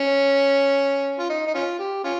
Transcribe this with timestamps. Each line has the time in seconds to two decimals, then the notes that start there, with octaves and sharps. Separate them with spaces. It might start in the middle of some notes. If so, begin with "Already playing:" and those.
Already playing: C#4
1.19 F4
1.29 D#4
1.47 D#4
1.54 C#4 F4
1.79 G4
2.04 C#4 F4